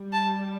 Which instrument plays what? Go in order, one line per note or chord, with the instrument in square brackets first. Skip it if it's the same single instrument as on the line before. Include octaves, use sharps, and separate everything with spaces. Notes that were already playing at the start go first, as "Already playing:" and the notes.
Already playing: [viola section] G3
[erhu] A5